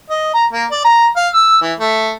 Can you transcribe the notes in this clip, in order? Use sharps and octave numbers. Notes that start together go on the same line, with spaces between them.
D#5
A#5
A#3
D5
A#5
F5
E6
E3
A3